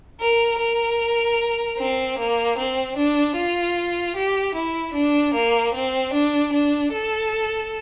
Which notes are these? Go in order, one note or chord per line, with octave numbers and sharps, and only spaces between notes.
A#4
A#4
C4
A#3
C4
D4
F4
G4
E4
D4
A#3
C4
D4
D4
A4